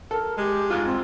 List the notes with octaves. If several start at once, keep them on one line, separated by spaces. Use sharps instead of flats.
A4 A#4
G#3 G4
G#2 F4
C4